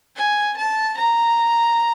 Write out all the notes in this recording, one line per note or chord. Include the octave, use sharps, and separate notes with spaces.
G#5
A5
A#5